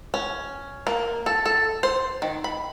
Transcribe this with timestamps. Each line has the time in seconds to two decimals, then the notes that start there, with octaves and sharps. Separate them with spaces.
0.14 C#4
0.87 A#3
1.26 A4
1.46 A4
1.83 C5
2.22 D#3
2.44 B5